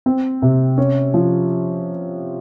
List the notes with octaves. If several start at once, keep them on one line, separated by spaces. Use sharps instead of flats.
C4
C3
C#4
F3